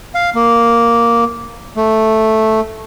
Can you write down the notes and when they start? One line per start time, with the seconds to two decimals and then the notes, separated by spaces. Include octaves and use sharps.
0.15 F5
0.35 A#3
1.77 A3